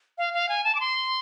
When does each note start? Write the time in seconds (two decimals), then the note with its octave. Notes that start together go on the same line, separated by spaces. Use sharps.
0.18 F5
0.34 F5
0.49 G#5
0.64 A5
0.75 D6
0.80 C6